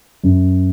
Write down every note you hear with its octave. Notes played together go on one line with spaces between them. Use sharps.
F#2